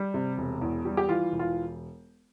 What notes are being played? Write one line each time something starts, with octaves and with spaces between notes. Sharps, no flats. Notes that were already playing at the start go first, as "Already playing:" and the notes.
Already playing: G3
C3
E1
E2
G3
G4
E3 F4
E1
F4